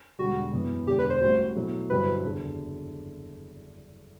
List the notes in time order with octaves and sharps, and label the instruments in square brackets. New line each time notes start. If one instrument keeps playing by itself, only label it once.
[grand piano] E1 E2 D3 G3 [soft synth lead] F#4
[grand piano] F#2 E3 B3
[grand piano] E1 E2 D3 [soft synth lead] G4
[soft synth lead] B4
C5
[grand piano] A1 A2 G3 C4 F#4
B2 F#3 A3 E4
[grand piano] G2 D3 F#3 C4 E4 [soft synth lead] B4
[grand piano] F#1 E2 D3